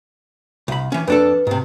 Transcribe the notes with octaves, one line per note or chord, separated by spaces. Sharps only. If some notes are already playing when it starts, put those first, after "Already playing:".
C2 B5
E3 C#4
F2 D4 A4 B4
G#2 C3